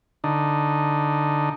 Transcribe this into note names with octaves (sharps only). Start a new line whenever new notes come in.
D3 D#4